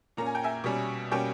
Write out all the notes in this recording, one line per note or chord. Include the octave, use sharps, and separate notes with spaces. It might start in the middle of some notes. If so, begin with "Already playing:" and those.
A#2 A#3 C#4 A#5
G#5
G5
E5 G#5
B2 G3 C#4
B2 G3 A#3 C#4 G5